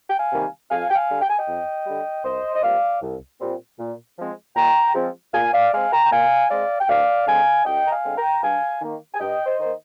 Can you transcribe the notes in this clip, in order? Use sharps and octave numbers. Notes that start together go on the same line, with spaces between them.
G5
F5 G#5
C3 D#3 G3 A#3
F2 F5 G#5
G5
F5 G#5
D3 G3
G5
G#5
D#5 G5
F2
D3 G3
C2 C5 D#5
D#5
A#2 G3 C4 D5 F5
C2
A#2 G3 C4
A#2
F3 G#3 C4
A#2 G5 A#5
F3 G#3 C4
A#2 F5 G#5
D5 F5
G#3 C4 F5 G#5
G5 A#5
G5
A#2 F5 G#5
G#3 C4 D5 F5
G5
D2 D5 F5
D3 G#3 C4 F5 G#5
D2 D#5 G5
A#5
F5 G#5
D3 G#3 C4
G5 A#5
G2 F5 G#5
D#3 A#3
G#5
G2 D#5 G5
C5 D#5
D#3 A#3 C5